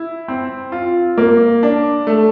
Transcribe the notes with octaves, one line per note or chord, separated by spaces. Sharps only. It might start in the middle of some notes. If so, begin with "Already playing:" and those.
Already playing: E4
C4
F4
A#3
D4
A3